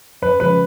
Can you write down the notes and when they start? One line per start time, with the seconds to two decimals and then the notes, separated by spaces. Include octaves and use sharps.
0.22 F#2 B4
0.40 C#3 F3 G#3 B4